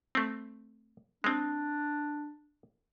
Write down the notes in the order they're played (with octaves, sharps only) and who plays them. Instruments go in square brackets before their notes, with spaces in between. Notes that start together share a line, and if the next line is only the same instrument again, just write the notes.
[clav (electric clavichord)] A3 C4
[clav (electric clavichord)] G#3 C4 [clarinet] D4